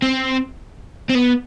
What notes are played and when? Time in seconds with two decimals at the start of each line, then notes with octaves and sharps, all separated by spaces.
0.02 C4
1.09 C4
1.15 B3